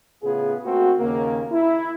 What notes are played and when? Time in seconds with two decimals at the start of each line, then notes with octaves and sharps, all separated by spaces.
0.23 A2 C#3 B3 F4 G#4
0.65 A3 A#3 C4 F#4
0.99 D#2 C#3 A#3
1.52 E4